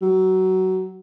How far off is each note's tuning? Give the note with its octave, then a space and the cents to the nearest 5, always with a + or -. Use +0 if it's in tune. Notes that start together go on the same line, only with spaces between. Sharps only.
F#3 +20